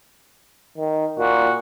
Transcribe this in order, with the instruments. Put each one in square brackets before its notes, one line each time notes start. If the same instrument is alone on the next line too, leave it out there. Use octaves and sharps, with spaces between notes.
[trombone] D#3
[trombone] A#2 [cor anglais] F#4